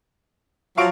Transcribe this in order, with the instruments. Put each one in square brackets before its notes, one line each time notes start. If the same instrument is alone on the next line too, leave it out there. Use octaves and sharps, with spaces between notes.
[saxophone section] F3 F#3 [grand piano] F5 C#6 D7